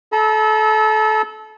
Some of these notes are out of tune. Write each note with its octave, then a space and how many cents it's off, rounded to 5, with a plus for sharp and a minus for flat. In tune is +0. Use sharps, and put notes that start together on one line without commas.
A4 -25 A#5 +25 E6 -30